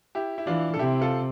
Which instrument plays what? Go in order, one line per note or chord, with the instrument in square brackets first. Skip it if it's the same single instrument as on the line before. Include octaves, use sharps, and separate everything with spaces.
[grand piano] E4 G4
E4
[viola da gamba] E3 [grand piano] D4 F4
[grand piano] A4
[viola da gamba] C3 [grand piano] E4 G4
[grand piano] F4 A4